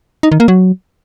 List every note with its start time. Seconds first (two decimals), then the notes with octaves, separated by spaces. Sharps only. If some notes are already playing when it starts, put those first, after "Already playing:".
0.23 D#4
0.32 D#3
0.40 A#3
0.48 F#3